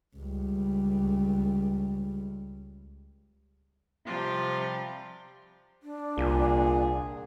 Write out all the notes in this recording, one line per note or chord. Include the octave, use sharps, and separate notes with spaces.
C#2 G3
C3 F3 G3 F4 G4
D4
C2 A#2 G#4